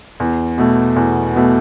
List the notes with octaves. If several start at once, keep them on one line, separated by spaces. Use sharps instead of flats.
E2
B2 A3
E2
B2 A3